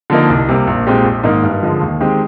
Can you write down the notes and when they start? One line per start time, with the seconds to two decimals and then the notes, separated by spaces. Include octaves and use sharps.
0.10 D3 F3 A#3 D#4
0.30 C2
0.49 C3 G3 A#3
0.67 A#1
0.87 A#2 G#3 C4 G4
1.04 A#1
1.24 G#2 D#3 A#3 D#4
1.44 G2
1.63 D3 F3 G#3
1.81 D#2
2.00 D#3 G#3 C4 G4